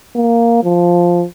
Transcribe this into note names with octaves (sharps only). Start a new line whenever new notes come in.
A#3
F3